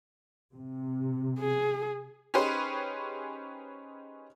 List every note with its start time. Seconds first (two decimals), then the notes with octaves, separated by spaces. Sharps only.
0.53 C3
1.40 G#4
2.34 C#4 D#4 G4 G#4 B4 C5